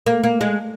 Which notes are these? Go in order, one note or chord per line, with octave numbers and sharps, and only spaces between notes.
A#3
A#3
G#3